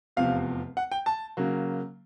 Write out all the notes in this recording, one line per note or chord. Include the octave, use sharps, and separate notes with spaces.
F1 E2 C3 F3 F5
F#5
G5
A5
C#3 F#3 A#3